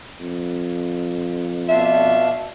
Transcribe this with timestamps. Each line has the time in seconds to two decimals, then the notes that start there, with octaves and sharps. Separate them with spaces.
0.20 F2
1.68 B2 D4 F4 E5